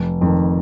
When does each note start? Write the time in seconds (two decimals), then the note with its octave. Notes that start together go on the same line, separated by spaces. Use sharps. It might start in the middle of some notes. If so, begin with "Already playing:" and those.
Already playing: F1
0.21 F2 D#3